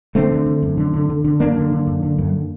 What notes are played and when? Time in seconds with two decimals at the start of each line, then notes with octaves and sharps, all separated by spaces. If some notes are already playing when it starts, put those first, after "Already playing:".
0.15 D3 A3 C4
0.31 D3
0.46 D3
0.63 F#2
0.78 D3
0.94 D3
1.09 D3
1.24 D3
1.40 F#2 A#3 D4
1.57 D3
1.72 D3
1.87 F#2
2.03 D3
2.18 F#2